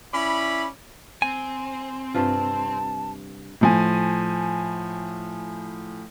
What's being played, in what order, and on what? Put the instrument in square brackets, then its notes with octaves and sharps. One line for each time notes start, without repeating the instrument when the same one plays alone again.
[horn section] C#4 E4 D5 B5
[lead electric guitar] C4 [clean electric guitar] G#5
[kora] G2 C3 F4 [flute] A5
[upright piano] A2 F3 G#5